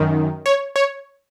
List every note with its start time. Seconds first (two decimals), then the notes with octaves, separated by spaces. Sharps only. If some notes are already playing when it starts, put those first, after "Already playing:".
Already playing: F#2 D#3
0.46 C#5
0.76 C#5